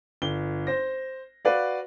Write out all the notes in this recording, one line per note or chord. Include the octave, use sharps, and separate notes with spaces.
G1 G7
C5 A#6
F#4 B4 D5 F5